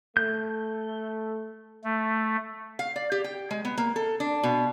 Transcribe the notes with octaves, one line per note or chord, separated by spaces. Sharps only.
A3 G6
A3
F5
D5
G4
G5
G#3
B3
A#3
A4
D4
B2